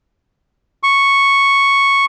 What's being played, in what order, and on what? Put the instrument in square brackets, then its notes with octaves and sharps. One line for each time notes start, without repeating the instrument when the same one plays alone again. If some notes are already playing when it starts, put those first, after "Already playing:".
[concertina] C#6